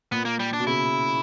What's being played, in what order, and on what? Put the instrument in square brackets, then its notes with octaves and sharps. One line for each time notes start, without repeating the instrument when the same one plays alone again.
[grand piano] A#2 [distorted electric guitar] B3
[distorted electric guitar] A#3
G3
D4
[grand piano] B2
[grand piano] C#3 [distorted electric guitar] E4